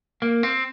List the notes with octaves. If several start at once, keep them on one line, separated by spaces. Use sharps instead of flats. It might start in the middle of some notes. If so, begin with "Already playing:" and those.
A#3
C4